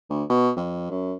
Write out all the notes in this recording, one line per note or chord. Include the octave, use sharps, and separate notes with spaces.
D2
B2
F2
F#2